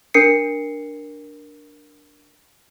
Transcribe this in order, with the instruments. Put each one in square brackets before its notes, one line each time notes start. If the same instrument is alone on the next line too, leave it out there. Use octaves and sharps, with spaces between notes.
[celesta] D4 A#4 C7 C#7